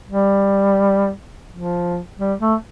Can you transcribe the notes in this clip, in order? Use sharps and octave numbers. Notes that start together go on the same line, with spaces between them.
G3
F3
G3
A3